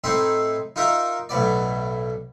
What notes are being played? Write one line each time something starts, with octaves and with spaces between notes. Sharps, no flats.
A2 C4 D#4 E5 C6
D#4 F4 A#4 E5
B1 A2 B3 D5